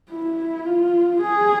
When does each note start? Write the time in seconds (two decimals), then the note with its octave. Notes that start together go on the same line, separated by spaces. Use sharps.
0.11 E4
0.65 F4
1.21 G#4